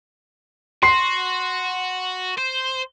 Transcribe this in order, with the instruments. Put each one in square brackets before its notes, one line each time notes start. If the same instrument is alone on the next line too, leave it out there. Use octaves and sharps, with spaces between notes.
[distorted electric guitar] F#4 [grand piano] C6 C7
[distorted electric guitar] C5